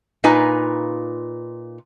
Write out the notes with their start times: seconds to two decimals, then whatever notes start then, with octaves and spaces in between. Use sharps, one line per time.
0.24 A#2 D#4 F4 B4 G#5